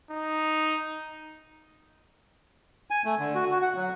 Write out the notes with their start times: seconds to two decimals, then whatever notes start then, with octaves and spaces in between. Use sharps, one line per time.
0.10 D#4
2.91 G#5
3.05 A3
3.19 D3
3.35 F#4
3.51 F#4
3.62 F#5
3.76 F#3